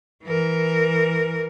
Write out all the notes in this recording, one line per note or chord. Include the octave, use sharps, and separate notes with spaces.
E3 A#4